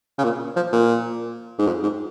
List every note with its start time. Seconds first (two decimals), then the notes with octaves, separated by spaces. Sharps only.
0.18 C#3
0.24 A#2
0.56 F3
0.72 A#2
1.59 G#2
1.67 F2
1.83 G#2